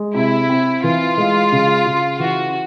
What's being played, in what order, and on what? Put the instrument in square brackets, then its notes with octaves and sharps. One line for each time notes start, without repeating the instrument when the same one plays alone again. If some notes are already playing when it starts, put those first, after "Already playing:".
Already playing: [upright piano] G#3
[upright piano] C3 [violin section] E4
[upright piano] C4
[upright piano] E3 [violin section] F4
[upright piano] G#3
C#3
C#3
[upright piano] E3 [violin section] F#4